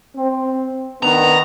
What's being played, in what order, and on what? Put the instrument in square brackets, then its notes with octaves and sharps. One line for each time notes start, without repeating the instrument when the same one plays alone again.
[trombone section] C4
[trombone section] D#3 B3 D4 [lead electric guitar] A#5